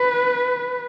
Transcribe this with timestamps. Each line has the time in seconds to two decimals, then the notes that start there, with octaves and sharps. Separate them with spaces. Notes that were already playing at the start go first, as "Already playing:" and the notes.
Already playing: B4